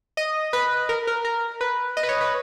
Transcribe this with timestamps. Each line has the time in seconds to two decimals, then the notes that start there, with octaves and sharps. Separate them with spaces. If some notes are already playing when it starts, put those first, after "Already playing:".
0.17 D#5
0.53 B4
0.89 A#4
1.07 A#4
1.25 A#4
1.61 B4
1.97 D#5
2.03 B4
2.09 C#5
2.21 B4